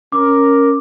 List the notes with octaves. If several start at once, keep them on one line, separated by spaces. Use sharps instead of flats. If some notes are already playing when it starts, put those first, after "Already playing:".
C#4 A#4 D6